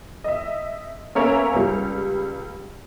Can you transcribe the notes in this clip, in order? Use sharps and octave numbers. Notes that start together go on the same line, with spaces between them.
D#5 E5
A#3 B3 C#4 A#4 C#5 E5
C#2 G3